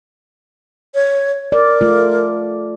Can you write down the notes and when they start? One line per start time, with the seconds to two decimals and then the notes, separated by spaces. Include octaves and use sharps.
0.95 C#5
1.52 A#4 D5
1.81 A3 F4